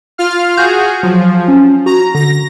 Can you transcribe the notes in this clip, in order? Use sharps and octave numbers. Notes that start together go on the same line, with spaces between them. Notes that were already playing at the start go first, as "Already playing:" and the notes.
F4 F5 F6
F#4 G#4 G6
F3 F#3
C#4
F#4 A#5
D3 A#6